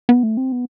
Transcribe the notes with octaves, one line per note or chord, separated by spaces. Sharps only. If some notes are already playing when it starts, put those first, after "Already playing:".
B3
A3
C4
B3